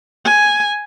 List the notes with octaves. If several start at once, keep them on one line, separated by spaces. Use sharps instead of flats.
G#5